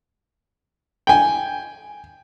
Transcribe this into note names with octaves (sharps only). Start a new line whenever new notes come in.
G5 G#5